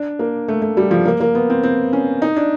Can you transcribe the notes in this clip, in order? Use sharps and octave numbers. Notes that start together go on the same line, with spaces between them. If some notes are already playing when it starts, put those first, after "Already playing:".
Already playing: D4
A#3
A3
A3
G3
F3
A#3
A#3
B3
C4
C4
C#4
D#4
D4